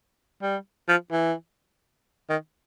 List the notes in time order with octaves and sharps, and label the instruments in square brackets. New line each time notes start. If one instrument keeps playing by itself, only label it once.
[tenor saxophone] G3
F3
E3
D#3